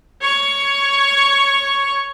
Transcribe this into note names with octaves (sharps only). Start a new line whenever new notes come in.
C#5 C#6